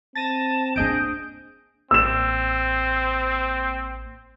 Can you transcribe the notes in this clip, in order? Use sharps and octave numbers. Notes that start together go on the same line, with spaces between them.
C4 A5 A6 A#6 D#7
A#3 D4 G#4 D#5 G6 D7
A1 A#3 C4 E6 E7